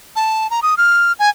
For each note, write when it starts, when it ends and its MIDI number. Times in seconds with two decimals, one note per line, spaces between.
0.16 0.50 81
0.50 0.60 82
0.62 0.75 87
0.78 1.12 89
1.19 1.29 80